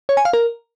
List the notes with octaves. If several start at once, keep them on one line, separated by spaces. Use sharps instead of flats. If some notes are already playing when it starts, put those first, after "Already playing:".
C#5
G#5
F5
A#4